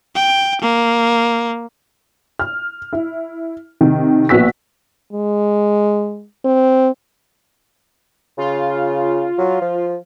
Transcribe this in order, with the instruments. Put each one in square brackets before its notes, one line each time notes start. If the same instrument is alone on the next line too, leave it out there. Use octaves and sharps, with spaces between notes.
[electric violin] G5
A#3
[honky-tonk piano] F6
E4
C3 D#3
A#1 A#2 B3 F#4 E6 B6
[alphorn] G#3
C4
[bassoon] C#3 [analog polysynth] F4
[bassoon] F#3
F3